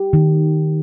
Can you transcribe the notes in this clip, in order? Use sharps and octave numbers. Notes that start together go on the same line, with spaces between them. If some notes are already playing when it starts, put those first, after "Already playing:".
Already playing: G4
D#3